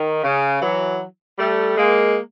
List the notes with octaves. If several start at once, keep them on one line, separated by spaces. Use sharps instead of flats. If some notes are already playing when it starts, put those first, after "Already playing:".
Already playing: D#3
C#3
E3 F#3
G3 A3
G#3 A#3